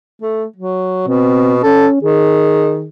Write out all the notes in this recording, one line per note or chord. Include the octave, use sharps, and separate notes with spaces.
A3
F#3
B2 C4
C#4 A4
D#3 G#4